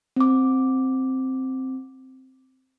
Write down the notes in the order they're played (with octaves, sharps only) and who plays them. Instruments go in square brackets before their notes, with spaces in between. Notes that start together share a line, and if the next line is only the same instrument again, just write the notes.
[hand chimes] C4 D6